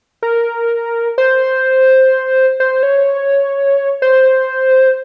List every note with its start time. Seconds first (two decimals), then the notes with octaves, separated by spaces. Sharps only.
0.23 A#4
1.18 C5
2.60 C5
2.83 C#5
4.02 C5